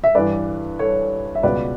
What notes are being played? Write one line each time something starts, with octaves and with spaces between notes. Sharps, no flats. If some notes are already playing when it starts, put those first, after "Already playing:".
E5
G2 E3 B4 D5
A4 C#5
E5
C#2 B2 B4 D5